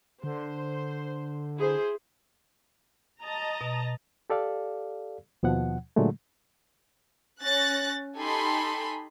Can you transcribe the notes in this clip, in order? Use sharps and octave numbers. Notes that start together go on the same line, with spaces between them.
D3 C5
E4 G#4 C5
D#5 A5 A#5
B2
G4 A4 D5 F5
D#2 B2 F3 F#5
A#2 D3 F#3 G#3 A3
C#4 F#6 A6 A#6
D#4 G4 A4 G#5 B5 C6